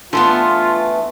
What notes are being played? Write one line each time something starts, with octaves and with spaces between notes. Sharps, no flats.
E3 A3 B3 D4 F4 A4 C6